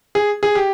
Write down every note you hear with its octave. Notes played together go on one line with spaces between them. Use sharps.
G#4
G#4
G4